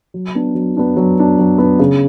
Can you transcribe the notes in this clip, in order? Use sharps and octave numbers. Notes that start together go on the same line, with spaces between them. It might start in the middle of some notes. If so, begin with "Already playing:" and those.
F#3
B3 D4
F#3
B3 D4
F#3
B3 D4
F#3
B3 D4
C#3